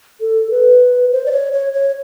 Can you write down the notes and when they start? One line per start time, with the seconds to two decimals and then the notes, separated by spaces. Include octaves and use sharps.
0.21 A4
0.51 B4
1.12 C5
1.26 D5
1.32 C#5
1.53 C#5
1.73 C#5